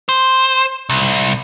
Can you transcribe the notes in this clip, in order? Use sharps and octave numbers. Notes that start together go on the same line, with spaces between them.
C5
C2